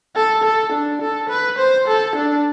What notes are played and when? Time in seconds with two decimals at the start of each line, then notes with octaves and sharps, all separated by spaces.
0.15 A4
0.44 A4
0.72 D4
1.01 A4
1.29 B4
1.58 C5
1.88 A4
2.16 D4